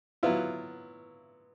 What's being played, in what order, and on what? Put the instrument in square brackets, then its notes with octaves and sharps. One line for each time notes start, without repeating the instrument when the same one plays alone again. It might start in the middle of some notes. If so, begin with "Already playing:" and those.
[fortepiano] F#3 B3 E4 F4